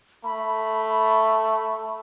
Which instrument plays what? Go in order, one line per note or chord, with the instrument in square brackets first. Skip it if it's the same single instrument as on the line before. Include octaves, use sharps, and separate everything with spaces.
[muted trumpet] A3 [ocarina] B5